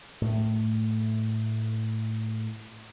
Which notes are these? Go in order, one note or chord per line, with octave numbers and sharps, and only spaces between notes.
A2 A3